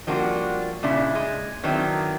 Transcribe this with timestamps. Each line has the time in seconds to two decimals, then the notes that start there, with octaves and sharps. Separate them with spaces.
0.07 F3 G3 A#3 D4 F#4
0.83 A#2 C#3 D4 E4
1.15 G#3
1.63 D#3 F#3 B3 C4 D4 E4